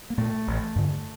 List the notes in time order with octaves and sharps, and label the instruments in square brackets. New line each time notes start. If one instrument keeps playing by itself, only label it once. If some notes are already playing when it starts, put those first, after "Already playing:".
[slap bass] A#3
A#2 A3
A1
G2 D3